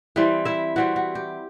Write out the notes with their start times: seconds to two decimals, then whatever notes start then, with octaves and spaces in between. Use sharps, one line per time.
0.16 E3 G3 C4 E4
0.45 E4 E5
0.76 E3 G3 C4 E4 F#4
0.96 F#4
1.15 G4